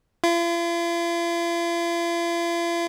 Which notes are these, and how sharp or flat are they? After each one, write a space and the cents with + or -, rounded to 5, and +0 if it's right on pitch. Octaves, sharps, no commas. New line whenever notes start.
F4 -45